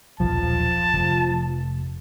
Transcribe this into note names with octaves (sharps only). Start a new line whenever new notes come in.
D#1 B1 F3 A5
F1